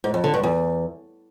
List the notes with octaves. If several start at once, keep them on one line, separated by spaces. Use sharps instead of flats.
G#2
F2
D3
G2
E2